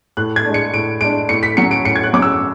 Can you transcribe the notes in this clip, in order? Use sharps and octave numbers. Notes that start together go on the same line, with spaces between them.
A2 F#6
G#6
G#3 D4
C#7
A2 D7
G#3 D4 D7
A2 C#7
B6
F#3 C#4 C#7
D7
A2 C#7
G#6
F#6
F#3 C#4 D6
E6